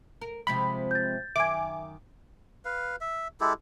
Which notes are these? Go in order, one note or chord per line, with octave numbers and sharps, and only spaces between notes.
A#4
C3 F3 G#3 B5
G6 A6
F#2 D#3 E5 G#5 D6
B4 F5
E5
G#3 E4 G4 A4